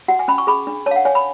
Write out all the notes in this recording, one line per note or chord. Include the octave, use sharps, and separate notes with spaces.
F#4 F#5
G#5
C#4 B5
C#6
G#4 B5
D4
C#5 A5
F5
F#5
C#5 G#5
B5